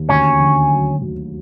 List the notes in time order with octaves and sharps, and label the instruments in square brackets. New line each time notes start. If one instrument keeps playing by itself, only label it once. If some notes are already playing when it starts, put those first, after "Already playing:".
Already playing: [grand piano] D#2
[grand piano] D2 [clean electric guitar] C#4
[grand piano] D3
F#3
D2